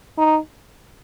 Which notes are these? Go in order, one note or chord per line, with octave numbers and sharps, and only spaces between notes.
D#4